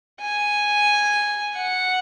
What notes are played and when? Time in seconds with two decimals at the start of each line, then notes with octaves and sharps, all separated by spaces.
0.21 G#5
1.57 F#5